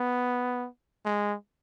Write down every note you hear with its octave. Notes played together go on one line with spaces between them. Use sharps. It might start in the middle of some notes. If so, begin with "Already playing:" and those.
Already playing: B3
G#3